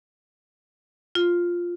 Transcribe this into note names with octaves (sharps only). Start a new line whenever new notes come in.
F4